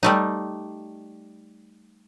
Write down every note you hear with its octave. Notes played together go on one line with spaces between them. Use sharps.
G3 A3 D#4